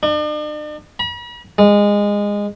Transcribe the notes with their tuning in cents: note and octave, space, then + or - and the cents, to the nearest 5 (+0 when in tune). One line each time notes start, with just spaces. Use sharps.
D4 +45
B5 -45
G#3 -20